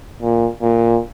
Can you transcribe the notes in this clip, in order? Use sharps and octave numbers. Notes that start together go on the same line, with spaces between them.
A#2
A#2